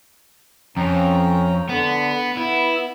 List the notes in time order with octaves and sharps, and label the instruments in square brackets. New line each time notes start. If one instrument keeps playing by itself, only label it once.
[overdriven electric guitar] F2 [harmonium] C#4 G5 A#5
[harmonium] D3 [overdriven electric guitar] B3
[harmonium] B3 [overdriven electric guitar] E4